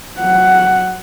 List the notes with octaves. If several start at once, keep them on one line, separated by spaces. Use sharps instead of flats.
F#3 F#5